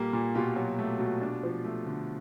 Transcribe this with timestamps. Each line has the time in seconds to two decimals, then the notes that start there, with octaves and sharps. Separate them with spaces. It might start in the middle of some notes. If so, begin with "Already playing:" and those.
Already playing: A#2 G3 A#3 G4 A4
0.13 A#2
0.35 B2 F4 G4
0.56 F#3
0.79 A3
0.99 B2
1.21 D4
1.43 F3
1.64 A3
1.87 D3